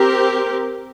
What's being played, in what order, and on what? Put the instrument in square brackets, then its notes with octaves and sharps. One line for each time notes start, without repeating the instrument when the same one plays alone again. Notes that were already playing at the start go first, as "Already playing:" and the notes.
Already playing: [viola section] C4 G4 A#4